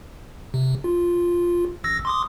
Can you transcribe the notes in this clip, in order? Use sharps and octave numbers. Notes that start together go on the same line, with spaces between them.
C3
F4
A1 E6 A#6
C6 D6 D#6